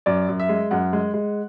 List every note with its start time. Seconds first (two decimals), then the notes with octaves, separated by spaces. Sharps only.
0.06 F#2 D5
0.29 F#2
0.40 E5
0.49 G#3
0.71 F#2 F#5
0.93 G#3
1.14 G#3